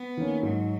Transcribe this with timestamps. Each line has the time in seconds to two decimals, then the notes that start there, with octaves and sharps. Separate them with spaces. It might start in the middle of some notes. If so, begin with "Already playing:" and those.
Already playing: B3
0.17 D#3 A#3 C#4
0.43 G#2 F#3